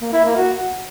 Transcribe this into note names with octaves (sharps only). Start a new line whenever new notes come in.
A#3
E4
A#3
F#4